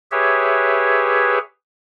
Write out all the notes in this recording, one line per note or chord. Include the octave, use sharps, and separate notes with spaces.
G4 G#4 B4 C#5 E5